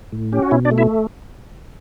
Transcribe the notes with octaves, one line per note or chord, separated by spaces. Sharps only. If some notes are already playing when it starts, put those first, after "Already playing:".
A2
C#4 G4
F#4
B2 E4
D4 D5
A3
E4 E5